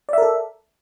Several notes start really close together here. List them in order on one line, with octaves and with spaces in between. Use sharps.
D5 E5 A#4 A4